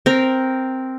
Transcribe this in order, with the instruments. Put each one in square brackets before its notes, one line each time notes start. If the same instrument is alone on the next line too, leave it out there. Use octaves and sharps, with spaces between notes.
[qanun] C4 A#4